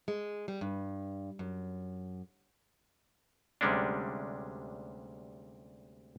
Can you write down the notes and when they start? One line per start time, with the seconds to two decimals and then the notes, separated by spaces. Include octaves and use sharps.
0.08 G#3
0.48 G3
0.61 G2
1.39 F#2
3.61 D2 C3 G3 G#3 C#4 D4